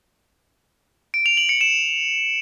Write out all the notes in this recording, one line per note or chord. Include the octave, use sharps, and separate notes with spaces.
D7
F7
F#7
C#7
E7